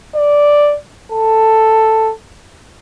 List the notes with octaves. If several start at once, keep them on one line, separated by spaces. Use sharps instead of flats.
D5
A4